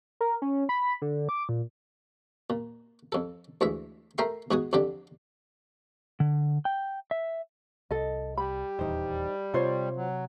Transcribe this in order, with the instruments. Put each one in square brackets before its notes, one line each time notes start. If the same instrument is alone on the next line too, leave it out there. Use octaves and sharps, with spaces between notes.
[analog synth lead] A#4
C#4
B5
D3
D6
A#2
[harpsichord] A#2
F2 A4
D2 E3 G#3 E5
A3 A#4 E5 G5 C6
G#2 B3 F#4 G#5 D#6
F2 D3 G4 D5
[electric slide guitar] D3
G5
E5
[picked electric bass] C2 [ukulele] A4 D#5
[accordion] G3 [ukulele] B5
[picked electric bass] D#1 E2 [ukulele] D#4 C5
[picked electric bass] C3 [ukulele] F4 C5 C#5
[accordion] F#3